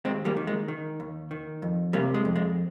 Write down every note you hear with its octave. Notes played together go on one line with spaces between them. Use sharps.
D#2 G#3 C4
G3 A#3
D#3
G#3
D#3
D#2
D#3
F2
C3 G3 A#3
G#3
F2
G#3